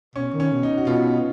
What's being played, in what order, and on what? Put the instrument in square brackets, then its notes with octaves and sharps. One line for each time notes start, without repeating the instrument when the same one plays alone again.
[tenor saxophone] B2 [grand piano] C#4
[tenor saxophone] D#3
[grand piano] C#4
[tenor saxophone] B2
[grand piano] D#4
F#4
[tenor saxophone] B2 [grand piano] F4